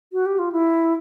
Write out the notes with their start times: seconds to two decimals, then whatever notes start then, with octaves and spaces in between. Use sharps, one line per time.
0.13 F#4
0.26 G4
0.39 F4
0.52 E4